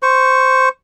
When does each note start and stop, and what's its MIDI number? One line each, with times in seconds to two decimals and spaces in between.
0.03 0.69 72
0.03 0.69 85